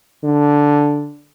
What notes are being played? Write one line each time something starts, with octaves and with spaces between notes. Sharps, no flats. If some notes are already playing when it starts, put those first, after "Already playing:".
D3